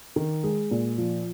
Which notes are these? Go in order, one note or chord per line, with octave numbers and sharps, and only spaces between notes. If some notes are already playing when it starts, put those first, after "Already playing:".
D#3
G#3
A#2
F3